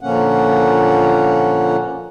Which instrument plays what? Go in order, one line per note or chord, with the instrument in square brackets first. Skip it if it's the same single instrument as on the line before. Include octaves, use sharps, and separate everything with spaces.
[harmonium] A#2 D3 F3 A#3 C#4 F#5